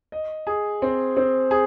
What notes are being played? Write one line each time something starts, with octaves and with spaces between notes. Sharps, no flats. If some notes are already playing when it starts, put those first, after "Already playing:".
D#5
G#4
C4
C4
G#4